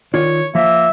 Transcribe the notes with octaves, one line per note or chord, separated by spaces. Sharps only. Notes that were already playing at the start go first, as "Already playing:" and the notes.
D#3 F4 C#5 D5
F3 A#3 E5